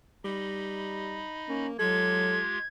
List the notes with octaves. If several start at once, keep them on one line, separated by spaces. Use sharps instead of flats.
G3 D#4 D#5 B5
A#3 C#4
F#3 G#3 F4 G4 A4 G#6